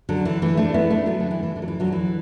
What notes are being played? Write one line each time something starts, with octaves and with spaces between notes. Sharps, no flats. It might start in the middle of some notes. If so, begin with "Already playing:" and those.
D3 F#3
E3
E3 A3
A3 D4
B3 E4
A3 D4
F#3 B3
D3
E3
E3
D3
F#3
E3
D3 F#3
E3